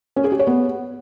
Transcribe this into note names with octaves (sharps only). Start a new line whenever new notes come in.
C#4
G#4
G4
C#5
B3